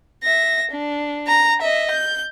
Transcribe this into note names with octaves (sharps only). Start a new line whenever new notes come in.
E5 A#6
D4
A#5
D#5 E5
G6